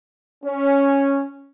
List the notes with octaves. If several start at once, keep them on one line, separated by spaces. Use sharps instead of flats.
C#4